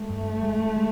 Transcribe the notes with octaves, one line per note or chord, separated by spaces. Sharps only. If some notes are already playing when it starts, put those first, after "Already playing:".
Already playing: G#3 A3
G2
G#3
G#3